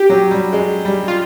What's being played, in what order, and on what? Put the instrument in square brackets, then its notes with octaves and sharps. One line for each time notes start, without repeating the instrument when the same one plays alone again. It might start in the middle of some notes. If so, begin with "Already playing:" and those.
Already playing: [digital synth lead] G4
[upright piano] F#3
G3
G#3
G3
[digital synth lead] F4